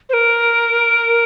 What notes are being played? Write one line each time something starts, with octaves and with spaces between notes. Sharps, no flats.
C5
A#4